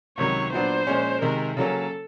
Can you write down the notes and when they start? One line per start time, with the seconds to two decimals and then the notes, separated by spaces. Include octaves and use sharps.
0.18 C#2 C3 D#3 F#3 C#5
0.52 A#2 F#3 B3 D4 C5
0.87 A#2 F3 G#3 C#4
1.22 C3 D#3 G#3 A#4
1.57 C#3 F#3 A#3 C#4 A4